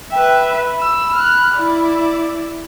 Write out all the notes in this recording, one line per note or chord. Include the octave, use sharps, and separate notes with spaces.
B4 E5 G5
B5
E6
F6 F#6
E4 D5